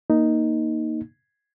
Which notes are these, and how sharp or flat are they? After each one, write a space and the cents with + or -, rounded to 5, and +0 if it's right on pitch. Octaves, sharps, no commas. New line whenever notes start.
A#3 +0 D#4 +0